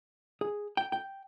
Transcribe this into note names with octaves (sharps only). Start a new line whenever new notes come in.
G#4
G5
G5